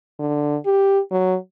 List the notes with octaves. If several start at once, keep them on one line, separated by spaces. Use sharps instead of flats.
D3
G4
F#3